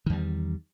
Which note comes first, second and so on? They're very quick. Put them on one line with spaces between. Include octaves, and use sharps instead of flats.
D#3 E2 G3